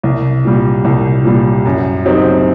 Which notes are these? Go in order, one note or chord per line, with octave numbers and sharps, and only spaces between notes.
C2
A#2 G3
C2
A#2 G3
F#2
F#3 C4 D#4 G4